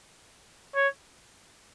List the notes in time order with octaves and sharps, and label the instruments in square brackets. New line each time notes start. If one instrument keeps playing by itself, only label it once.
[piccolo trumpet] C#5